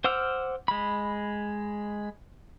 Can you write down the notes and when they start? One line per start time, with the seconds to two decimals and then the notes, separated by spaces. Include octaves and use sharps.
0.04 C5 F#5 D6 E6 F6
0.68 G#3 B5